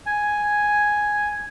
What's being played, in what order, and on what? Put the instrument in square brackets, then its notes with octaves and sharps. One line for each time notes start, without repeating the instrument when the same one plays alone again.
[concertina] G#5